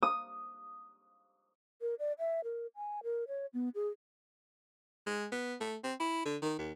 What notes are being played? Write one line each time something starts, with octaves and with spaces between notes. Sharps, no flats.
D#6
A#4
D5
E5
A#4
G#5
A#4
C#5
B3
G#4
G#3
B3
A3
C4
E4
D3
D#3
D#2